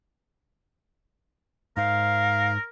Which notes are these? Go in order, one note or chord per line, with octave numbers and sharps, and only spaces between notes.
G#2 D#4 A#4 C5 F5